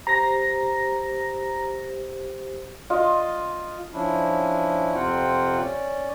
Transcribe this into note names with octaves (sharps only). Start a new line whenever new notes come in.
G4 C5 A#5 A#6
F4 D#5
F3 C#4 D4 E4
F2 C3 C4 F4 F#5 G5
C#4 D5